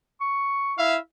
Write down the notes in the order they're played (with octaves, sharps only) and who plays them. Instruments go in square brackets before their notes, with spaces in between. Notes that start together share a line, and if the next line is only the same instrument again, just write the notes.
[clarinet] C#6
[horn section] E4 E5 F5